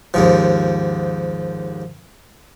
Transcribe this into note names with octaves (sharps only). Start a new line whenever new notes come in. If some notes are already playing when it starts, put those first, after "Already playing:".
D#2 G#2 F3